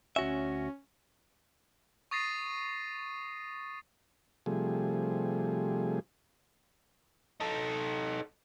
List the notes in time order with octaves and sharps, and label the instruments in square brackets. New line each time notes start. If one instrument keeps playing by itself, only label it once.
[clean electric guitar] D2 F#4 E5 [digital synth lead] C#4
[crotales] C#6 D#6 A6 A#6 C7 D#7
[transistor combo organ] C3 F3 G3 A3 G#4
[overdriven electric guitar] D#4 A4